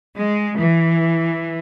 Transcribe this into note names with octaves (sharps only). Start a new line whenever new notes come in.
G#3
E3